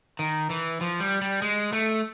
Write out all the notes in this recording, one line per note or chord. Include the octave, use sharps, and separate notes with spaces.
D#3
E3
F3
G3
G3
G#3
A3